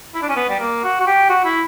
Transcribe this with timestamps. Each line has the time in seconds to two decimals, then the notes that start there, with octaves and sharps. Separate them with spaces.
0.14 E4
0.22 D4
0.29 C#4
0.36 B3
0.49 G3
0.60 A#3
0.84 F#4
1.00 F#4
1.07 G4
1.29 F#4
1.45 E4